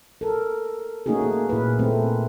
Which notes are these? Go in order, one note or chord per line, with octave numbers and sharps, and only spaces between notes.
A4 A#4
A3 A#3 C#4 D#4 F#4 G#4
A#3
A#2 E4 A#4 B4
A3 C4